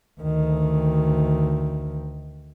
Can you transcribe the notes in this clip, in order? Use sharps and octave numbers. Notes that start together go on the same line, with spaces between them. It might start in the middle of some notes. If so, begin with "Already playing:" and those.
D2 D#3